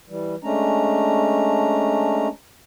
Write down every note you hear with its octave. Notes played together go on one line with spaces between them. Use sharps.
E3 G3
G#3 A3 C#4 D4 A#5